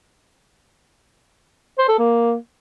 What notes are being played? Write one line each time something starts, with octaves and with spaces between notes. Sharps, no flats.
C5
A4
A#3